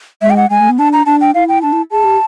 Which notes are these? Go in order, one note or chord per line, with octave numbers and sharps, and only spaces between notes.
G#3 E5
G5
F#5
G#3 G#5
A3
B3
D4 A5
A#5
D4 A5
G5
E4 F5
G5
D4 A5
E4
G#4 A5
G4